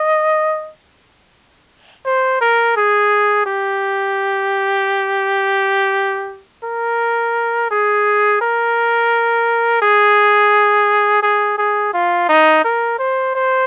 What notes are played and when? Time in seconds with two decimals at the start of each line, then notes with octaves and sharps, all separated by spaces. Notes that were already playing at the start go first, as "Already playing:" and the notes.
Already playing: D#5
2.06 C5
2.41 A#4
2.77 G#4
3.46 G4
6.64 A#4
7.71 G#4
8.41 A#4
9.82 G#4
11.22 G#4
11.58 G#4
11.94 F4
12.29 D#4
12.65 A#4
12.99 C5
13.35 C5